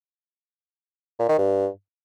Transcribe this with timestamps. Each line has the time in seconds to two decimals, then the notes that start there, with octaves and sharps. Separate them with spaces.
1.19 A#2
1.29 D#3
1.38 G2